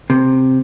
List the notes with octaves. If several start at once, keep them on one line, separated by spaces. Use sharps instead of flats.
C3